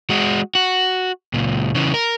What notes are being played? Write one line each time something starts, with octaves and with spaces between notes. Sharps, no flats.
G#3 F#4
F#4
C#2 A#2
C#3 E3
A#4